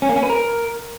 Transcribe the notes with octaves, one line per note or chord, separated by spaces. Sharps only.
C#4
A#3
C#4
B4
A#4